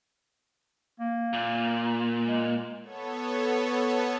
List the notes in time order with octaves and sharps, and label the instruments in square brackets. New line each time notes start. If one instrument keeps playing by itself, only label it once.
[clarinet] A#3
[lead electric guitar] A#2
[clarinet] G#3
[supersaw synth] B3 A4 C#5